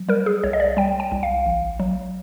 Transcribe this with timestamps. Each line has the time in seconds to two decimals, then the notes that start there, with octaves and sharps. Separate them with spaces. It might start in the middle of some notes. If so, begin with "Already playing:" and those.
Already playing: F#3
0.08 G3 A#4
0.26 G#4
0.43 C2 C#5
0.53 D#5
0.60 D5
0.77 G3 G5
1.00 G5
1.12 C2
1.23 F5
1.46 A1
1.79 F#3